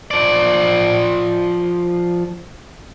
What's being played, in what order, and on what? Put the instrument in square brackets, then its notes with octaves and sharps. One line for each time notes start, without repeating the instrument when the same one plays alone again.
[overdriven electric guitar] F3 D5